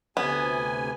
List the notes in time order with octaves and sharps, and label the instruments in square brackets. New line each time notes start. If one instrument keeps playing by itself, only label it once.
[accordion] D2 C3 G#5 [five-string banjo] B3